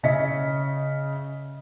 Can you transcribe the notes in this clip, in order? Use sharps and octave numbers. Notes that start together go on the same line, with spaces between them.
C#3 C#4 D#5 E5 B6 C#7